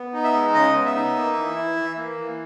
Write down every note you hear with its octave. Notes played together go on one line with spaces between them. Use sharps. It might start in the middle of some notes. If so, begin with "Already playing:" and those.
Already playing: B3
D#4
E5
G#3
C#3 D#5
B3
E5
D#4
A#3
E3
E4
E3
A#3
E3